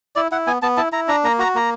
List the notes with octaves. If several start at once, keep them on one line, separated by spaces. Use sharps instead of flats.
E4 D5
E4 F#5
B3 G#5
B3 A5
E4 A5
E4 A#5
D4 A#5
A#3 A#5
F#4 A#5
A#3 A#5